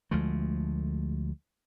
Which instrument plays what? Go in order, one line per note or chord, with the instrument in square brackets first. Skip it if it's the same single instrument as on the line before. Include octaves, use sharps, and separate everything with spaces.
[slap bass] D2 F3 G#3 A3